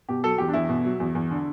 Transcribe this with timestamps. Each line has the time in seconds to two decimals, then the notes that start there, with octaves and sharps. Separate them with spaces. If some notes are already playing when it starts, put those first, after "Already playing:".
0.09 B2 G4
0.23 F#3 A4
0.38 E2 G4
0.49 D4
0.53 E2 E4
0.69 B2
0.84 F#3
1.00 E2
1.15 E2
1.31 D3